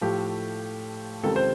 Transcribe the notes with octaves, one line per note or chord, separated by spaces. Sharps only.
A2 F3 A3 G4
C#2 C3 D#3 G3 A4
C5